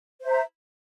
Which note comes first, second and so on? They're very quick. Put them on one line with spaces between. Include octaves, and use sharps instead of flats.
C5 E5 A#5